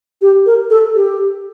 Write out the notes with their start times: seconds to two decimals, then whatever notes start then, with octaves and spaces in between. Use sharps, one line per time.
0.22 G4
0.46 A#4
0.70 A4
0.95 G4